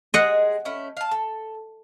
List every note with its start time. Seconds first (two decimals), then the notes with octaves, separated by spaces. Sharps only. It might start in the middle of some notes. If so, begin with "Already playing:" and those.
0.14 G#3 G#4 D#5 F#5
0.65 A3 C#4 E4
0.97 F5 A5
1.11 A4